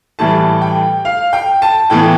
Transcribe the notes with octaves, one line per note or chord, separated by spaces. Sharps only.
A2 E3 G3 A5
G5
F5
G5
A5
A2 E3 B3 G5